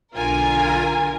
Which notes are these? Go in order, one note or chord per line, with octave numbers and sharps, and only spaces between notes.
B1 D3 F4 A#4 G#5